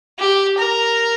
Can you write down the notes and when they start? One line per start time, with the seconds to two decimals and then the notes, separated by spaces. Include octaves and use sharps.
0.19 G4
0.58 A#4